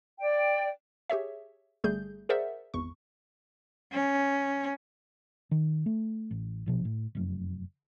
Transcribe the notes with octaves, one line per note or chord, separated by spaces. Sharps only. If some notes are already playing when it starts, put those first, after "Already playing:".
D5 G5
G4 G#4 C#5 E5
G1 G3 A3 G#4 G6
G#4 A#4 C5 D5 E5 F#5
G#1 E2 C#6
C#4
D#3
A3
A1
A#1 B2 F3
A2
F1 F#2